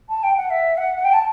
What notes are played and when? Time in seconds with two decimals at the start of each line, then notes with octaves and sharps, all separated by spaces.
0.09 A5
0.23 G5
0.37 F#5
0.50 E5
0.77 F#5
1.04 G5
1.13 A5